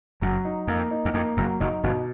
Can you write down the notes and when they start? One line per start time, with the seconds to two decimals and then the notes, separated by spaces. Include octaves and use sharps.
0.21 F#1 F#2 F#3
0.45 D#4
0.67 F2 A#3
0.91 D#4
1.05 E2
1.14 F2 A#3
1.37 F#1 F#2 F#3
1.60 F#1 F#2 D#4
1.83 G1 G2 B2